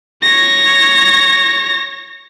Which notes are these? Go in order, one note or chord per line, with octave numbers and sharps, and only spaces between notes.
C#5 A#6